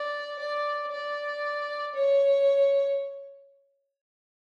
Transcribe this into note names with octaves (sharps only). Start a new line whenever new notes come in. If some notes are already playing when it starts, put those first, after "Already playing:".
Already playing: D5
D5
D5
C#5